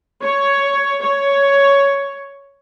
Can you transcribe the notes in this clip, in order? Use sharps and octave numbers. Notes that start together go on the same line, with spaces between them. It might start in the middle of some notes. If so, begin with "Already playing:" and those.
C#5
C#5